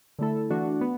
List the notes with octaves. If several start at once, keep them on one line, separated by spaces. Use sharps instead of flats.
D3 A3 E4 A4
E3 A3 D4 F#4
B3